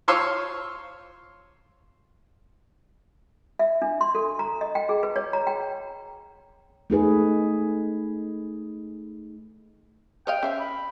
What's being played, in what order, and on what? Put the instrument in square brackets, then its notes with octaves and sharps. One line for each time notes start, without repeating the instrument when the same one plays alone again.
[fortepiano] F4 C5 C#5 F5 C6 E6
[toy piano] E5
D4
C6
A4
A#5
D#5
G5
G#4
B4
C#5
A#5
G5
[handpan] A3 D#4 G#4 B4
[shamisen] C#5 D#5 F5 [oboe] G5
[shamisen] C#4 C5 F5 [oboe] E5
[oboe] B5